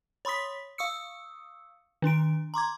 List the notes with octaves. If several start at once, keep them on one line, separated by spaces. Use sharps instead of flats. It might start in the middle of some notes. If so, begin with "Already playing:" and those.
C#5 B5 C6 D#6 B6
F5 C#6 D#6 E6 C#7
D#3 D4 C6 D7
A#5 C6 D6 G#6